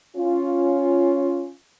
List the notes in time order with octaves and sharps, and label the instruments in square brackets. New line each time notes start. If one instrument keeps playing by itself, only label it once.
[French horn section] C#4 F4